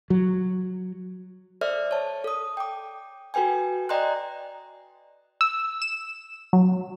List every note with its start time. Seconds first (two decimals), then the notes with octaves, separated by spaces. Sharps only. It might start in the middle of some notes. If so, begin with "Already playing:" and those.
0.10 F#3
1.61 A4 C5 D5 E5 F6
1.91 C#5 A5
2.24 A4 D#6
2.57 G5 D6
3.34 F#4 A4 B4 G5 G#5
3.89 D5 D#5 G5 A#5 C6 F#6
5.41 E6
5.82 E7
6.53 F#3